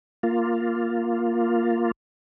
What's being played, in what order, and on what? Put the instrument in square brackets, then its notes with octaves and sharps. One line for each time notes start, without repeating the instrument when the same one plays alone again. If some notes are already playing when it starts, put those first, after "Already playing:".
[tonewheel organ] A#3 F4